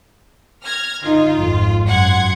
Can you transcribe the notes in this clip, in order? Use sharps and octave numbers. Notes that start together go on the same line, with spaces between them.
F6 G#6 A#6
D3 D#4 F4
G#1 F2
F#2 F#5 C6 G#6